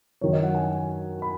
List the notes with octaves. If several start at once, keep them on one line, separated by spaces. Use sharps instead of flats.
F#2 D#3 F#3 C#5
D#5
F#5
G#5
B5